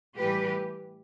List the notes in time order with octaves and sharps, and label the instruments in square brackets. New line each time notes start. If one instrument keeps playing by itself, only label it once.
[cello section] A2 E3 G3 G4 B4